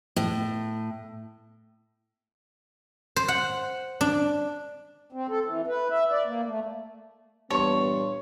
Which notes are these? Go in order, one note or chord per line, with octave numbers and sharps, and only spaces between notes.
A2
C5
F#5
D4
C4
A4
E3
B4
E5
D5
A#3
A3
G2 A#2 E3 B3 C#5 A5 C6 C#6